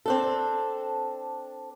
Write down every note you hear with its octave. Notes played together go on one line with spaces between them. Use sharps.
C4 D4 A4